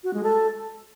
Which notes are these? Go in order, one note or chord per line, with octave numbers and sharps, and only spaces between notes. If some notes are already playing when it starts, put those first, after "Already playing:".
F#4
G#3
A4